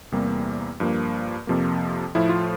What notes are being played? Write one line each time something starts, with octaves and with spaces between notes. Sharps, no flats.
E2 C3 G3 A#3
G2 F3 A#3
F2 C3 F3 A#3
A2 F3 A3 E4
F4